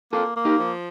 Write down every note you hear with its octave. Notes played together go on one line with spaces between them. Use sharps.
A#3 F4 A4
A#3
D#4 G4
F3